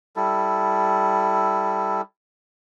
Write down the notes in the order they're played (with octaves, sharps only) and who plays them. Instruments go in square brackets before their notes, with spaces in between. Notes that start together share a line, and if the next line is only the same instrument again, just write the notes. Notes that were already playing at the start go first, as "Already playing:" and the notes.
[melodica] G3 E4 A4